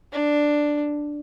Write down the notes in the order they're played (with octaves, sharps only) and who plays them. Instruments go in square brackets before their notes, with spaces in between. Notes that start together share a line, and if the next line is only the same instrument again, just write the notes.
[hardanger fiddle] D4